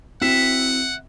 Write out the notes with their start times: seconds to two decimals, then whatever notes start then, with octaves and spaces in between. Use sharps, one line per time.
0.21 C4 E4 F#4 E5 F#5